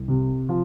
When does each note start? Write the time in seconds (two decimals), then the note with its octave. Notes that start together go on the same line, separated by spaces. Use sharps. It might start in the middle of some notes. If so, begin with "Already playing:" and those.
Already playing: C2
0.08 C3
0.49 F3